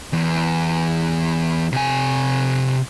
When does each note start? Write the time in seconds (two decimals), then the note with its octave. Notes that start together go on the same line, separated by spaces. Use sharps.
0.13 E2
1.73 C3 G#5